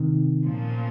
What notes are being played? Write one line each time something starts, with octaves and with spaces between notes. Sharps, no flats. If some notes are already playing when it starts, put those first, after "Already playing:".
Already playing: C3 D#3
A#2 F3 A#3 C#4